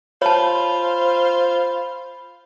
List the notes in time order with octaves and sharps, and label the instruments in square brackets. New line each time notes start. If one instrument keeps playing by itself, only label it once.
[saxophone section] F4 C5 F5 [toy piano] C#5 A5 [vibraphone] B5